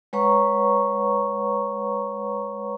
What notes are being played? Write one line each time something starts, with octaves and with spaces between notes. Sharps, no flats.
G#3 B4 C#5 F#5 A#5 C#6